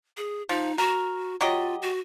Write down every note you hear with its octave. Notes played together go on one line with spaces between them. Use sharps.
G#4
F3 D#4
F#4 A#4
F#3 F4 G4 D#5
F#4